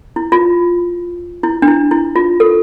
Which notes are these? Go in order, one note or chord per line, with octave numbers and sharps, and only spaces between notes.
E4
F4
E4
D4
E4
E4
F4
A4